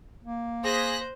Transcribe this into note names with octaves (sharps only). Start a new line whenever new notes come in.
A#3
G#4 C5 F#6 A#6 B6